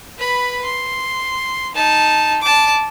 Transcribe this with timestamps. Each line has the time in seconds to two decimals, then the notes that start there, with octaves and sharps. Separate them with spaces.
0.18 B4 B5
0.65 C6
1.75 D#4 A5
2.42 A5 D6